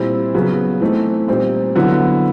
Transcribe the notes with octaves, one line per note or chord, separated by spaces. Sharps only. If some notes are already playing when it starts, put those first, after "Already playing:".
Already playing: A#2 G3 C4 E4
C#3 F#3 B3
E3 A3 C4 D#4
A#2 G3 C4 D#4
D3 F#3 B3 E4